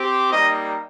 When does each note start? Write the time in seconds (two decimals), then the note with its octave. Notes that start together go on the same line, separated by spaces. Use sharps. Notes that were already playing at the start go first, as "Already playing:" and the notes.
Already playing: C4 G4
0.31 G3 A#3 D#4 D#5